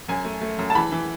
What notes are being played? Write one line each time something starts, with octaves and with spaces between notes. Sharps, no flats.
F#2 G#5
A3
A3
F#2
A5
E3 B5
E3